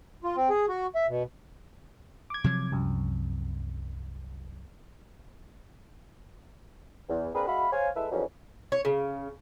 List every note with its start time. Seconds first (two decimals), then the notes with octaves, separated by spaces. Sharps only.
0.24 F4
0.37 C4
0.50 G#4
0.69 F#4
0.95 E5
1.09 B2
2.30 D6 G#6
2.44 C3 F3 F#3
2.72 C2 F#2
7.09 E2
7.35 A#3 C4 D4 G#4 A#4 B4
7.48 G#3 F#4 E5 F5 B5
7.73 C5 C#5 F5 G#5
7.96 G#3 E4 A4 B4 E5
8.12 F2 D3 E3 F#3 G#3 C#4
8.72 C#5
8.85 C#3